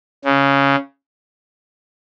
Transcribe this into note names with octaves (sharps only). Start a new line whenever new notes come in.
C#3